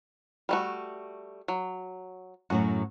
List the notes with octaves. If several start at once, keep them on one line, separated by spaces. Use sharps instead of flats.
G3 A3 F#4
F#3
F#2 A2 F#3 F#4